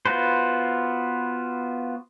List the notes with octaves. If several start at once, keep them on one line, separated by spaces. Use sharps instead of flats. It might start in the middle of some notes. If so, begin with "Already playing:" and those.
B3 F4 F#4 B4 C5